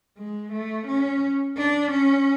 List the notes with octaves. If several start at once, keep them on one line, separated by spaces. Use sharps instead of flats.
G#3
A3
C#4
D4
C#4